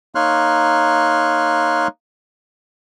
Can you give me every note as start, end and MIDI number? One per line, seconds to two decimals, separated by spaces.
0.15 1.87 58
0.15 1.87 63
0.15 1.87 73
0.15 1.87 84
0.15 1.87 89
0.15 1.87 90